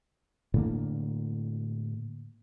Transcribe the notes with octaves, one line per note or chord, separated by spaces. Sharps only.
A2 D3 A#3